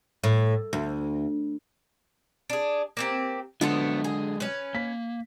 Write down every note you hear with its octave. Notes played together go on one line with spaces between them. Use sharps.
A2
D2
D4 G#4
A#3 C4 G4
D3 F3 F#3 G#3 A3 B3 F#4
G#4
C#4 B4
A#3 B6